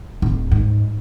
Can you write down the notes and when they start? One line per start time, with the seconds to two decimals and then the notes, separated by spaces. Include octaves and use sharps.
0.22 D1
0.51 G#2